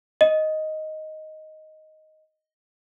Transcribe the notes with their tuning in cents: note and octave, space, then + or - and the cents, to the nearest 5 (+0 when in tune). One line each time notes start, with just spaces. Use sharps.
D#5 +5